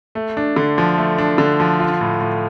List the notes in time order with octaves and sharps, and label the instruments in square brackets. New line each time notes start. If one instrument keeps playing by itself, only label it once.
[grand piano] A3
D4
D3
F3
A3
D4
D3
F3
F4
A2
A2